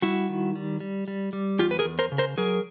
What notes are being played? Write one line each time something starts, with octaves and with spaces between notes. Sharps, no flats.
G3 E4 F#4
D#3
G3
G3
G3
G3
E2 F4 G4
B4
G#4 A#4
E2
A#4 C5
C#3
A#4 C5
F#3 G#4 A#4